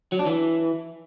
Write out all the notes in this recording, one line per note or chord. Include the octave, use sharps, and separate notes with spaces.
F#3
D4
E3